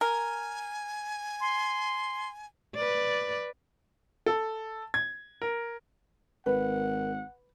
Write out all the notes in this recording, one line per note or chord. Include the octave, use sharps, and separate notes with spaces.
A#4 G#5
C6
B4 D5
A4
G#6
A#4
G#1 A#4 B4 F#5